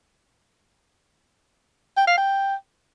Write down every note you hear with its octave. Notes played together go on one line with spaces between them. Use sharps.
G5
F5
G5